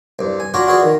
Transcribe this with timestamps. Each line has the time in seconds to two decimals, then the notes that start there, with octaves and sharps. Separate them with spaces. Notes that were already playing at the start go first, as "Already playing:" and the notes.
0.19 C2 G2
0.40 G#5
0.54 D4 F4 F#4 C#5 D5 A#5
0.67 F4 F#4 G#4 B4 C#5 D5
0.83 D#3